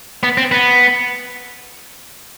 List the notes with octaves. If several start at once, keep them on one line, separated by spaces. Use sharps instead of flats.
B3
C4
B3